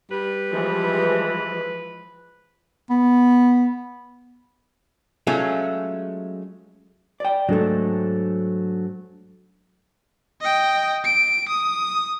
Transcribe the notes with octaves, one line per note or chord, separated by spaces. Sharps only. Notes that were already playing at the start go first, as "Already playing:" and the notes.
G3 B4
E3 F3 G#3
B3
F#3 G#3 A3 C#4 F4
D5 G5
G#2 F#3 A3 D4 A4
D#5 G5
D7
D#6